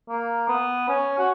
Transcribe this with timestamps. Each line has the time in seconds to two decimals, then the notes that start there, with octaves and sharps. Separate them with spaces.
0.09 A#3
0.49 B3
0.88 C#4
1.18 F#4